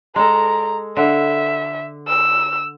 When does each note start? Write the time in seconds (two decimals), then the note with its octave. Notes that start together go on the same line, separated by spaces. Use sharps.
0.16 G#3 A4 A#5
0.96 D3 E5
2.08 E6